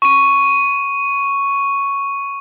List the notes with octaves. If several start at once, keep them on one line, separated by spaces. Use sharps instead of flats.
C#6 D#7